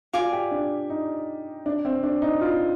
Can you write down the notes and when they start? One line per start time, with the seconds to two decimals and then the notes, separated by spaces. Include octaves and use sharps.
0.13 F4 D5 F5 G#5
0.33 G4
0.51 D4
0.90 D#4
1.66 D4
1.85 C4
2.03 D4
2.22 D#4
2.41 F4